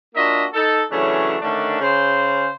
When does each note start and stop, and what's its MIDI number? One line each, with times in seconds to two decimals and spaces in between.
0.15 0.46 58
0.15 0.46 62
0.15 0.46 65
0.15 0.46 66
0.15 0.46 75
0.15 0.46 76
0.54 0.82 63
0.54 0.82 69
0.91 1.36 49
0.91 1.36 52
0.91 1.36 54
0.91 1.36 57
0.91 1.36 61
0.91 1.36 62
1.41 1.78 50
1.41 1.78 51
1.41 1.78 57
1.41 1.78 61
1.41 1.78 62
1.81 2.49 49
1.81 2.49 72